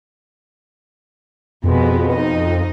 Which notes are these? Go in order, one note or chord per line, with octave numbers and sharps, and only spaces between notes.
F2 B2 G#3 B3
D#4 D#5